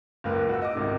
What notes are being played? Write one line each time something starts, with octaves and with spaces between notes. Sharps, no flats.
F#1 C#2 A#3 B4
F#4 E6
D#5 D6
G#1 C#2 C3 D#3